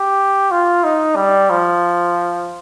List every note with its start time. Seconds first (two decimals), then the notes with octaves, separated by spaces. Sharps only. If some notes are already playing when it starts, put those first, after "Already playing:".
Already playing: G4
0.51 F4
0.84 D#4
1.16 G3
1.50 F3